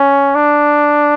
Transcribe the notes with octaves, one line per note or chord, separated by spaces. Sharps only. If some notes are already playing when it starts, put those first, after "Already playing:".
Already playing: C#4
D4